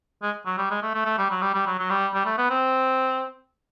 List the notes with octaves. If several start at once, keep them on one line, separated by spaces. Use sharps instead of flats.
G#3
F#3
G3
G#3
A3
A3
A3
G3
F#3
G3
G3
F#3
F#3
G3
G3
A3
B3
C4